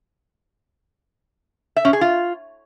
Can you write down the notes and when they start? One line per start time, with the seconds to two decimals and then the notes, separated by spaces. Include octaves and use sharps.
1.76 E5
1.85 C#4
1.93 G#4
2.01 F4